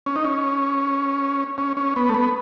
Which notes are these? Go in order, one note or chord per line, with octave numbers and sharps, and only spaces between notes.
C#4
D#4
C#4
C#4
C#4
B3
A3
B3